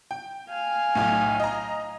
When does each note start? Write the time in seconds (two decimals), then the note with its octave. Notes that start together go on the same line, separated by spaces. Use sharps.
0.11 G5
0.49 F5 G#5
0.95 B1 A2
1.40 D#5 A#5